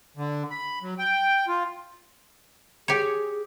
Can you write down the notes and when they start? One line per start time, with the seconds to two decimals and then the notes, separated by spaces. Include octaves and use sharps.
0.17 D3
0.51 B5
0.82 F#3
0.99 G5
1.48 F4
2.88 G4 G#4 C#5